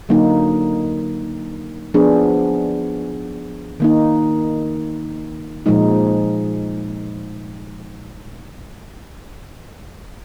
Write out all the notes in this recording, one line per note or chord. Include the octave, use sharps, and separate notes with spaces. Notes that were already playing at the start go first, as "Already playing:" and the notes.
D3 F#3 A#3 D#4
F3 B3 D4 G#4
D#3 A#3 D#4
A#2 F3 G#3 D#4